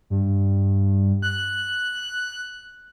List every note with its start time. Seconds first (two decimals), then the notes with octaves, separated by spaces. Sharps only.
0.10 G2
1.22 F#6